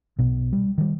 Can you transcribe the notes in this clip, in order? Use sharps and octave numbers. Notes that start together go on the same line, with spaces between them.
B1 B2
G3
D#3 G3